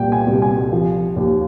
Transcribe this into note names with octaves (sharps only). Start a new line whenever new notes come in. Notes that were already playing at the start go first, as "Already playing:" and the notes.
Already playing: C2 A#2 G5
G#5
C2
G#5
F3
D#2